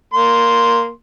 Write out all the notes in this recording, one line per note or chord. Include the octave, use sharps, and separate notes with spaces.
A#3 C6